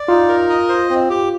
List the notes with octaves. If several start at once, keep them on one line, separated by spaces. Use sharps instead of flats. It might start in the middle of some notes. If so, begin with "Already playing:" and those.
Already playing: D5
D#4 F4
A#4
D#5
C5
C4
G4